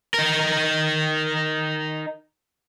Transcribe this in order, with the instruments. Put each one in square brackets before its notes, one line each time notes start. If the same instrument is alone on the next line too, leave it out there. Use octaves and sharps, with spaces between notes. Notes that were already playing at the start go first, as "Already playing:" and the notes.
[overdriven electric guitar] D#4 A#4